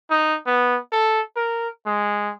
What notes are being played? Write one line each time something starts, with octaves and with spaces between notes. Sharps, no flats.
D#4
B3
A4
A#4
G#3